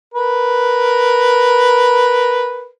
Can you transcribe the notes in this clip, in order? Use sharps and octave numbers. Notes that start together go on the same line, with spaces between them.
A#4 B4